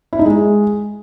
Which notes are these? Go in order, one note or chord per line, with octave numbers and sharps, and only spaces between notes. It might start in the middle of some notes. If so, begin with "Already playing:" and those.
E4
D#4
G#3